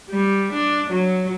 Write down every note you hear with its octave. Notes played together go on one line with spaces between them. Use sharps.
G3
D4
F#3